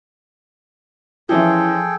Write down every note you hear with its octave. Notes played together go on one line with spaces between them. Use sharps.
E3 F3 C#4 E4 G#4 A4 G5